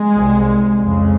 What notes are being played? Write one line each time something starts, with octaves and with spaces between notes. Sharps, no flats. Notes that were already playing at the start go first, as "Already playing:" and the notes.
Already playing: G#3
C2 C3
F2 C#3 G#3